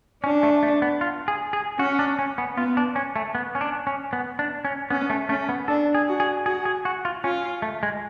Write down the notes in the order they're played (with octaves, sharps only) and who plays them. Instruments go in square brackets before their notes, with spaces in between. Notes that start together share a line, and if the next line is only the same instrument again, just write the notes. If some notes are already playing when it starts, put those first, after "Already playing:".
[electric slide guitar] C#4 [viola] D4
[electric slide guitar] A3
A3
B3
F4
G#4
G#4
[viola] C#4 [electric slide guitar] F#4
[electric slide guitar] D4
C#4
B3
[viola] B3 [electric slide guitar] F4
[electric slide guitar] D4
C#4
A3
B3
C#4
D4
C#4
B3
D4
C#4
[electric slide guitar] B3 [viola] C#4
[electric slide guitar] A3
[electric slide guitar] A3 [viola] C#4
[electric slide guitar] B3
[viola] D4 [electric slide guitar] A4
[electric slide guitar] G#4
[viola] F#4
[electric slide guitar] G#4
[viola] F#4 [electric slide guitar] G#4
[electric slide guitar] G#4
F#4
F4
[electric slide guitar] C#4 [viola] F4
[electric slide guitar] A3
G#3